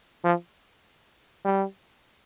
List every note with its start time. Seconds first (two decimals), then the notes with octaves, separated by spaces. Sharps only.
0.24 F3
1.45 G3